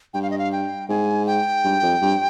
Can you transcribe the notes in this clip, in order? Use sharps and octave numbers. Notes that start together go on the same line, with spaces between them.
G2 G5
F5
D#5
F5
G5
G#2 G#5
G5
G2
F2
G2